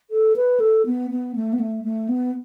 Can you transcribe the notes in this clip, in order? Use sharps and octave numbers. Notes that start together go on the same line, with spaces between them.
A4
B4
A4
B3
B3
A3
B3
A3
A3
B3